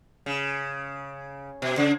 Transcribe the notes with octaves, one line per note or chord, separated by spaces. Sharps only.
C#3
B2
C#3